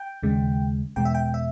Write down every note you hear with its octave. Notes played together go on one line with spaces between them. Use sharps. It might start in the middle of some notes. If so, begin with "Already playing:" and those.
Already playing: G5
D#2 C#3 G#3
E2 B2 G#3 B3 G5
E5
G5
E5